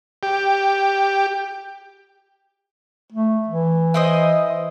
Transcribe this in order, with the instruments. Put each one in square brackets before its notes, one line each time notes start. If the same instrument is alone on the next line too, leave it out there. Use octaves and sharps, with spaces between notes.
[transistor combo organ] G4
[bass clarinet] A3
E3
[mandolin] E4 C5 D#5